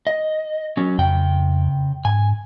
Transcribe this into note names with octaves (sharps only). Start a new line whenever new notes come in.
D#5
F#3 C#4
F2 C#3 G5
G#2 G#5